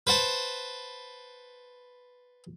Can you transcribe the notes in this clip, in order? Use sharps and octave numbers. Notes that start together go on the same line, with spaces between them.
B4 C5 F#5 A5